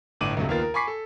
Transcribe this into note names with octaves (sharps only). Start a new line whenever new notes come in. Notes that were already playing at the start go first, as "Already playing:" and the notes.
G1 A2 D4 D6 D#7 F#7
C#2 G2 C3 F#3 A3
D#2 A#3 B3 F4 A#4 A6
A#4
G#5 B5 C#6 D6 B6 C7
A4